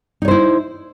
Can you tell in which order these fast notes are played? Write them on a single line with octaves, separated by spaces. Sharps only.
D#4 C#5 C5 E4